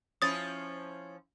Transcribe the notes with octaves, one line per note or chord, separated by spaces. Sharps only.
F3 C#4 E4 D#6 A6